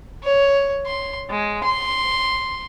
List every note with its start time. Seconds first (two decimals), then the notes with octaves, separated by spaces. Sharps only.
0.24 C#5
0.86 C6
1.30 G#3
1.64 C6